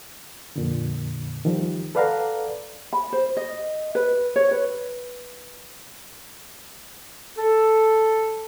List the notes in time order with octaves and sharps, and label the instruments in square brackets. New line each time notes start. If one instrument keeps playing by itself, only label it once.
[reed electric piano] F2 A#2 D3
D#3 F3 G3
A4 B4 D5 F5 F#5 A#5
[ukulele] B5
C5
D#5
B4
C#5
B4
[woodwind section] A4